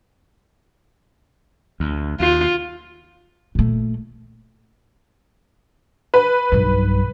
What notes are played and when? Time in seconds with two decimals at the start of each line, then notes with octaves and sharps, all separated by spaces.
1.80 D2
2.20 D#2 F4
3.55 A#2 A3
6.14 B4
6.52 B1 G2